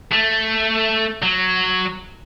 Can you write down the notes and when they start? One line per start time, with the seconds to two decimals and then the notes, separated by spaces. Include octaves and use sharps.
0.12 A3
1.23 F#3